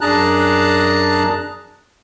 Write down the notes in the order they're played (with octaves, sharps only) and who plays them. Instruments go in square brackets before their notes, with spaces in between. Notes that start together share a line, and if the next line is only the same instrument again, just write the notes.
[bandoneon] F#2 D4 G#4 A5 A#5 F#6